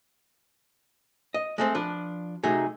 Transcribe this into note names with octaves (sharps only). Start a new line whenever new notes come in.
D#5
G#3 A3 C4
F3 D4 B4
C3 F#3 A3 D#4 G#4